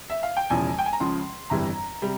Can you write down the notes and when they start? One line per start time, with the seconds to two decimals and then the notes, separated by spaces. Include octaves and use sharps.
0.10 E5
0.23 F5
0.37 G5
0.50 E1 E2 C#3 F3 G#5
0.79 G5
0.86 G#5
0.93 A#5
1.00 C#2 C#3 F3 C6
1.50 G1 F2 E3 G3 A#5
2.02 C3 G3